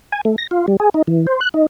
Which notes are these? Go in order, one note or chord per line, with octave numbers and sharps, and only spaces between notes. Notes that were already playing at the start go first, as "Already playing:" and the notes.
G#5
A3
A#6
F4
G3
G#4
D#4
E3
C5
F#6
D#4